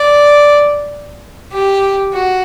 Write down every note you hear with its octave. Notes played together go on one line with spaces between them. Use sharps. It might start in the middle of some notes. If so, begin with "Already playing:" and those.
Already playing: D5
G4
F#4